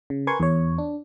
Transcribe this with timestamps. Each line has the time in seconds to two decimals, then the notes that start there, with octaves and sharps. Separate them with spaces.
0.10 C#3
0.27 A#4 B4 G#5 C6 C#6 G#6
0.40 E2 C#5
0.78 D4